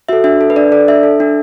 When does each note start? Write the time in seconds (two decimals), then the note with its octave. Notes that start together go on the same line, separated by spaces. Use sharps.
0.09 F#4 A4 E5
0.24 D4 E5
0.41 A4
0.50 B4
0.56 D4 D5
0.72 A4 D5
0.88 D4 E5
1.03 A4
1.20 D4